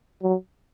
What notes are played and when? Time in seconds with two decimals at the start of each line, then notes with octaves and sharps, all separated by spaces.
0.23 F#3